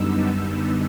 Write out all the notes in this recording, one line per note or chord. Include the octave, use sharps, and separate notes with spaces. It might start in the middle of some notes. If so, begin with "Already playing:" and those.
Already playing: F#2 D3 G3 B3 D#4 E6